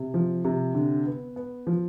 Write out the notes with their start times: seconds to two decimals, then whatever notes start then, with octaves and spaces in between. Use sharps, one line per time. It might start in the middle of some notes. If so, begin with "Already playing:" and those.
Already playing: C3
0.14 F3
0.45 C3
0.75 D3
1.06 B3
1.36 B3
1.67 F3